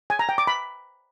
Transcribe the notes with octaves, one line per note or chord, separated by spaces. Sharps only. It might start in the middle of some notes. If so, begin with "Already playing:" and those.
G#5
A#5
G5
D6
B5